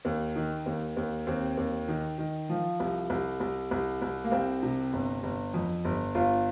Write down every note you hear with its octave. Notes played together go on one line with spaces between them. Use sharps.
D#2
D#3
D#2
D#2
D#2 C4
D#2
D#3
D#3
F3
C2
C2
C2
C2
C2
A#3
C2 C4
C3
G1
G1
F2
G1
G1 F4